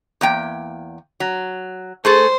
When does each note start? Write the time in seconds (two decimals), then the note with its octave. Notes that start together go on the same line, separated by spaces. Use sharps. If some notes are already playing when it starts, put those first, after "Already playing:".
0.21 E2 A#3 G5
1.20 F#3
2.05 A3 G#4 A4 C5